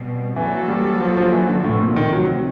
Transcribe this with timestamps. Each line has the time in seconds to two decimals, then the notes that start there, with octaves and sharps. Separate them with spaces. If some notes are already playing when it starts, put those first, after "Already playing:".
Already playing: B2 G3 C4
0.36 E3 F#3 A#3 D4 F#4 A4
0.68 G3
1.01 F3
1.17 F3
1.33 E3
1.48 D3
1.64 D2 A2 C3 F3
1.81 A#2
1.96 D#3
2.13 F#3